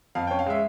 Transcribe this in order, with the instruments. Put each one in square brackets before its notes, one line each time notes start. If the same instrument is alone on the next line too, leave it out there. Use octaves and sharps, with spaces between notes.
[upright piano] F2 F5
C#4 G5
F5
G#3 E5